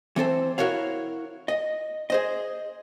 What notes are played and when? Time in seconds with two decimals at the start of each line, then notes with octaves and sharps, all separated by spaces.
0.16 E3 C4 A4 C5
0.58 E4 F#4 A#4 C#5 F5
1.48 D#5
2.10 G#4 C5 D#5